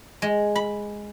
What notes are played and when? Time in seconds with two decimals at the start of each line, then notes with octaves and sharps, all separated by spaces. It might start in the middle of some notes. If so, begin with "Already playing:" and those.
0.22 G#3
0.56 B5